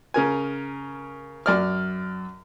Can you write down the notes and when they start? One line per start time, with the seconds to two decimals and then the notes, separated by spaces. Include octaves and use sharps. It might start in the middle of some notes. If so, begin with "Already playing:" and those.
0.14 C#3 A#4 G#5
1.46 F#2 D5 F6